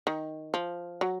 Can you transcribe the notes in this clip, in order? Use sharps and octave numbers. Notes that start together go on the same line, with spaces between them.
D#3
F3
F#3